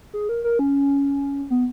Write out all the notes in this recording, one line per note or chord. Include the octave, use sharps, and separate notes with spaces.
G#4
A#4
A#4
C#4
B3